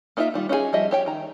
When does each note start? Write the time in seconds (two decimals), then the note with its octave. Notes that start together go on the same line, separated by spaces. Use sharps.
0.17 A#3 D#4 F4 A#4 E5
0.34 D#3 G3 F4
0.49 C#4 D#4 F4 G#4
0.73 F3 G3 D#5 E5
0.91 G4 C#5 G5
1.06 D#3 A#5